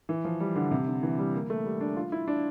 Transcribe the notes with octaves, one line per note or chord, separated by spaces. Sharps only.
E3
F3
G3
D3
C3
D3
E3
G3
A#3
A3
G3
D4
F4
E4
D4